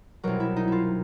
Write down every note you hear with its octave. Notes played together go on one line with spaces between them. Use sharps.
C2 B2 F#3 A#4
E4
D#4
E4 F4